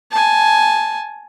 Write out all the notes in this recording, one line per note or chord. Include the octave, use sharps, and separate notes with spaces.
G#5 A5